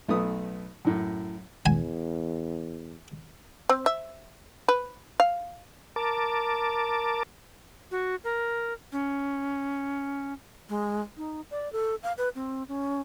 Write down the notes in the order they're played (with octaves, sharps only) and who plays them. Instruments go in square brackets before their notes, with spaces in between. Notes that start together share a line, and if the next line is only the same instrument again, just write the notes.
[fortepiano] B1 A3 B3 D#6
F#2 A2
[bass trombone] E2 [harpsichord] G#5
[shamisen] C4
E5
B4
F5
[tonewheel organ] A#4 A5 D6
[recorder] F#4
A#4
C#4
[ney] G#3
D#4
D5
A4
F5
B4
C4
C#4